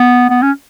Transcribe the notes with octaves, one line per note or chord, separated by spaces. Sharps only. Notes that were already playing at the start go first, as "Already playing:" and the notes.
Already playing: B3
B3
C#4